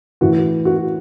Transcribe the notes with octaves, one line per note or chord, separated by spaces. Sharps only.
A2 E3 F#4
F#4